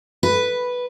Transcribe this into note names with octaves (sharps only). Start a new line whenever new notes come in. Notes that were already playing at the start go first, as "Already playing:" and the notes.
B4